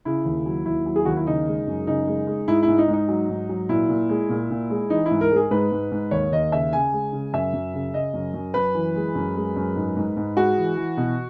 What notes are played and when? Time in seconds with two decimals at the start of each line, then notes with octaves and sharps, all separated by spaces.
0.05 C#3 E4
0.25 D#2
0.46 F#3
0.66 D#2 E4
0.86 F#3
0.96 G#4
1.05 D#2 F#4
1.17 E4
1.26 C#3 D#4
1.47 G#3
1.67 F#2
1.87 C#3 D#4
2.07 G#3
2.27 G#3
2.48 G#2 E4
2.63 E4
2.68 G#2
2.78 D#4
2.88 G#2
2.93 D#4
3.08 F#3
3.29 G#2
3.49 F#3
3.69 A#2 E4
3.89 A#2
4.09 G#3
4.29 A#2
4.50 A#2
4.70 G#3
4.90 E3 D#4
5.06 E4
5.11 G#2
5.21 A#4
5.31 G#3
5.36 G#4
5.51 G#2 B4
5.72 G#2
5.92 G#2
6.11 D#2 C#5
6.32 D#2 D#5
6.52 C#3 E5
6.73 C#3 G#5
6.93 G#3
7.13 C#3
7.33 F#2 E5
7.53 F#2
7.74 C#3
7.94 C#3 D#5
8.14 F#2
8.34 F#2
8.54 F#2 B4
8.75 E3
8.95 G#3
9.15 F#2
9.36 G#3
9.56 F#2
9.76 G#2
9.97 G#2
10.17 G#2
10.36 G#3 F#4
10.57 E3
10.77 E3
10.97 B2